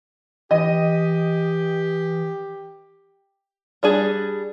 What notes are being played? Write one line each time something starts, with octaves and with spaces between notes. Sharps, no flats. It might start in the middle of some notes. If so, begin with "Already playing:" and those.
E3 G4 D#5
G3 D4 G#4